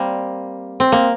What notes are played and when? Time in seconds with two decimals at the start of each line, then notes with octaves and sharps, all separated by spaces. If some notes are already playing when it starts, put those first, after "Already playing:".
Already playing: G3 A#3 C4
0.80 C4
0.92 A#3